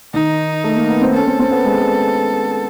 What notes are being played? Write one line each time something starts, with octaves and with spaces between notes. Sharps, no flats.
D#3 D#4
A3
A#3
B3
C4
C#4 A4
C4
C4
B3
G#3